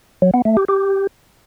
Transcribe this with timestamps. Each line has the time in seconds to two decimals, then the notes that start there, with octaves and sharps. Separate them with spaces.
0.22 F#3
0.34 B3
0.45 A3
0.57 G4
0.68 G4